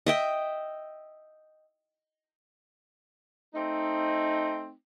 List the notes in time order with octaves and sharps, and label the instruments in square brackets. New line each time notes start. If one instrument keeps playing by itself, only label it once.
[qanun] D#5 E5 G5
[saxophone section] A3 C4 D#4